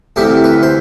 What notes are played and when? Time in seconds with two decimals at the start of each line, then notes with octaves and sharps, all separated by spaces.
0.16 D2 C3 E3 G4
0.44 B4
0.63 C5